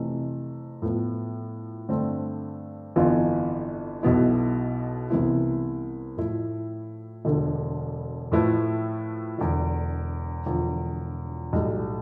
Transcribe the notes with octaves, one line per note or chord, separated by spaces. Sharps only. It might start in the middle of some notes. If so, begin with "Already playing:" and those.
Already playing: F2 C3 E3 A3
A2 F3 B3
G2 D3 A3 C4
G1 F2 E3 B3 F4
B1 B2 B3 E4
C2 C3 E3 B3 E4
A2 F3 A3 E4
E1 D2 D3
A2 F3 A3 E4 B4
E1 E2 D3
E1 E2 D3 F3
B1 A2 G3